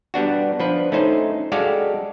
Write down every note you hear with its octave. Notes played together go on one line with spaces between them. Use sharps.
G3 B3 D4 F#4
F3 D4 B4
A3 C#4 D#4 C5
G#3 F#4 G4 A4 D5 F5